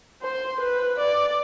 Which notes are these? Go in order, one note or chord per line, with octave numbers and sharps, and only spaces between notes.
C5
B4
D5